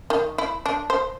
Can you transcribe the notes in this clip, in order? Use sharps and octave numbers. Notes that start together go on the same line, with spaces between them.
D#3
E4
D4
C5